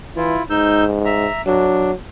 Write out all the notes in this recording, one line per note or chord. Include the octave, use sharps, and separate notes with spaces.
E3 E4 F4
G#2 D#4 E6 G6
E5 A#5
F#3 D4